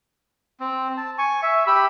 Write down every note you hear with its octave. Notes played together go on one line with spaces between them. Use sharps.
C4
A5
G#5 C#6
E5
G4 B5 E6